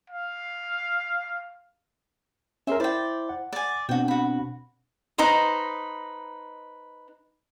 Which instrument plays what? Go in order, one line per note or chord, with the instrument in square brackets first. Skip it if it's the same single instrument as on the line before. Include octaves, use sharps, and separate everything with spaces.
[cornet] F5
[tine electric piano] C#4 G#4 A#4 [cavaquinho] E5 C6
[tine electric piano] E4 C5 E5 [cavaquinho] D5 G5
[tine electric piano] F#5
[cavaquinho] D5 G#5
[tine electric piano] B2 C4 D4 [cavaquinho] F#4 G5
[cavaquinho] F#4 B5
D#4 B4 C5 D#5